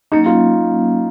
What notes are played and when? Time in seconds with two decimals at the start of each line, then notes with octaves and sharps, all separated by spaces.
0.12 F#3 A#3 C#4 D#4
0.26 F4
0.40 F#3